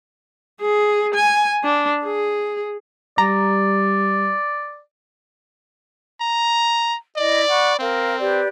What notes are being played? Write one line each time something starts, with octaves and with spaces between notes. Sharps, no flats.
G#4
G#5
D4
G#4
G3 D5 A#5
A#5
E4 D5 D#5
F#5 B5 C#6
C4 A#4 F5
G4 B4 D5